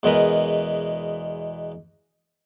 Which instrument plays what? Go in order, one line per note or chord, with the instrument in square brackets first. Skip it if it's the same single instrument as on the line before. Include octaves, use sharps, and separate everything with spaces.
[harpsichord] E2 B2 G#3 A#4 B4